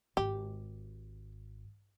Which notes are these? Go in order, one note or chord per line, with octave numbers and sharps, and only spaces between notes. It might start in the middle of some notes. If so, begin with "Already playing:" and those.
G#1 G4